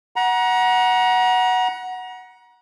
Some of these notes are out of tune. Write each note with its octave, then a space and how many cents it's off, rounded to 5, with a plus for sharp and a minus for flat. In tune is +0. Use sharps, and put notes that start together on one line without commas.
F#5 +0 A#5 +35